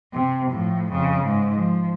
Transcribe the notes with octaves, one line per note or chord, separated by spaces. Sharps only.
C3
A2 F3
F2 C#3
G#2
F3